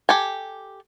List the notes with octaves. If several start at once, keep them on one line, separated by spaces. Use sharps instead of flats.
G4 A4 G#5